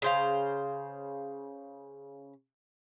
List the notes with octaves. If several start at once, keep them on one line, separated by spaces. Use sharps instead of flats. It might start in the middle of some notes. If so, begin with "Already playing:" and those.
C#3 C5 F5